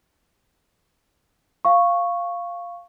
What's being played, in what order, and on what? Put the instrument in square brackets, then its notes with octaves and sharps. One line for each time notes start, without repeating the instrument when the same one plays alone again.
[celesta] F5 C#6